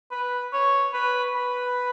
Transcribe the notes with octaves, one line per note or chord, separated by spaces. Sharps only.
B4
C#5
B4
B4